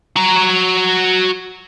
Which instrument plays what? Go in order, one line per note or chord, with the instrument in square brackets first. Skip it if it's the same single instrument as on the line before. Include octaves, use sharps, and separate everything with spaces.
[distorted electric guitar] F#4 A#5